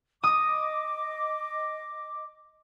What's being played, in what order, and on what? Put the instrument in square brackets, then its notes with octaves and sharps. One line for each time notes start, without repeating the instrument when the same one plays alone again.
[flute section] D#5 D6 [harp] D#6